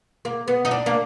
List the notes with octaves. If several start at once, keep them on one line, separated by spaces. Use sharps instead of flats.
A#3
B3
D#4
D4
A#3